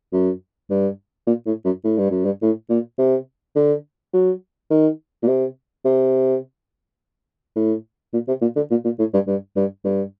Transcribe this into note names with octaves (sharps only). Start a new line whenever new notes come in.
F#2
G2
A#2
A2
F#2
A2
G2
F#2
G2
A2
A#2
C3
D3
F#3
D#3
A#2
C3
C3
A2
A#2
C3
A#2
D3
A#2
A#2
A2
G2
G2
G2
G2